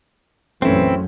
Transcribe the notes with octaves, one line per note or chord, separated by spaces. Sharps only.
A#1 F#2 E3 F#3 A3 C4 C#4 E4